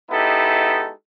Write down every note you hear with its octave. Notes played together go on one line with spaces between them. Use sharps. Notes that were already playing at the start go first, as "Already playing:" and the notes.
G#3 B3 D#4 E4 G4 A4